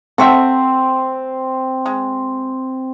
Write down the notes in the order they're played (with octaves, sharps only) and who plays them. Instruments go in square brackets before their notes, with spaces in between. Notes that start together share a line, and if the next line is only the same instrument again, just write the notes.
[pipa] A3 F#4 E5 [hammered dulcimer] C4
[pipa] G#3